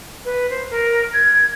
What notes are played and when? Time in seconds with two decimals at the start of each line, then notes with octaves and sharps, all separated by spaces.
0.25 B4
0.50 C5
0.70 A#4
1.13 G#6